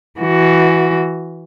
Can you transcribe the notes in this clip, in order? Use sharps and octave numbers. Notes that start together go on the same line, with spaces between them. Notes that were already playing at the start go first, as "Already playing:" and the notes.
E3 F#4